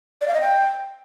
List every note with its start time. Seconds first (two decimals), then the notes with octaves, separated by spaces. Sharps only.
0.21 D5
0.28 F5
0.34 D#5
0.41 G5